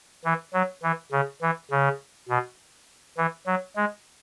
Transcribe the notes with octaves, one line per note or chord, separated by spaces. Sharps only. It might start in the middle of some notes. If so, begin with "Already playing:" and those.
E3
F#3
E3
C#3
E3
C#3
B2
E3
F#3
G#3